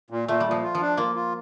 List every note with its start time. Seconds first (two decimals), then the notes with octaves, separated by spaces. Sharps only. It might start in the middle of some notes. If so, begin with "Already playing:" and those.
0.10 A#2
0.28 A#2 A3
0.40 G3
0.46 A#2 F3
0.63 F4
0.75 F3
0.81 D4
0.97 A#3 F4
1.15 F4